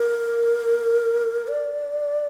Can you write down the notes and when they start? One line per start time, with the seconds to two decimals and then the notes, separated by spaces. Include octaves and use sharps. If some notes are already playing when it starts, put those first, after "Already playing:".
Already playing: A#4
1.48 D5